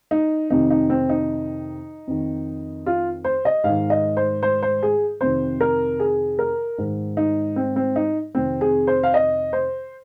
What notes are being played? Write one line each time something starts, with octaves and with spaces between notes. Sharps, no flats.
D#4
F2 C3 D#3 D#4
D#4
C4
D#4
F2 D#3
F4
C5
D#5
G#2 F5
D#3
D#5
C5
C5
C5
G#4
F2 C3 D#3 C5
A#4
G#4
A#4
G#2 D#3
D#4
C4
C4
D#4
F2 C3 D#3 C4
G#4
C5
F5
D#5
C5